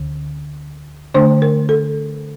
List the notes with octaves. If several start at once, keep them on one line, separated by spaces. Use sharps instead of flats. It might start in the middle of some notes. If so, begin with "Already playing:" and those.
Already playing: D2 D3
D3 A3 D4 C5
A#4
A4